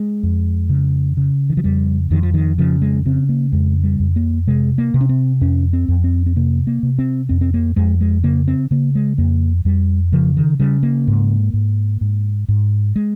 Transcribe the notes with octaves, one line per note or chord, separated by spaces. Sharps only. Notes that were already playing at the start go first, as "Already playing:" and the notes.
Already playing: G#3
F2
C#3
C#3
D#3
F3
F2 G3
F2 D#3
F3
D#3
C#3 F3
G#3
C#3 C4
A#3
F2 G#3
G3
F2
A#3
C3 G#3
A#3
C3
C#4
C4
F2 C#4
C4
F2
C4
C4
C3 A#3
A#3
C3
C4
F2 C4
C4
A#3
F2 G#3
G#3
C#3 A#3
C4
C#3 A#3
G#3
F2 A#3
F2 G3
C#3 F3
D#3
C#3 G3
A#3
G#2
G#2
G#2
G#2
G#3